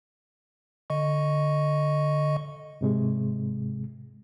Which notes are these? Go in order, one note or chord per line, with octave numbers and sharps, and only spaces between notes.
D3 D#5 C#6
G#2 C3 G#3